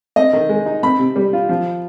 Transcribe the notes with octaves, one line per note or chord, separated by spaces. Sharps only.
C4 D#5
D#3
G#3
D#4
C4 B5
C3
G3
F4
F3